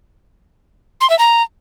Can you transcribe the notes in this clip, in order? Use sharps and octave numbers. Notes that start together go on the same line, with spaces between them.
C6
E5
A#5